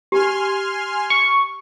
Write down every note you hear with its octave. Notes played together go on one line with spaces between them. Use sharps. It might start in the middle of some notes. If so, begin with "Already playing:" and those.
G4 G#5 C6 F6
C#6